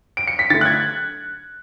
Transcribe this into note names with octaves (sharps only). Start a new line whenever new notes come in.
D7
C#7
B6
D3 A3 A6
F#6
G#6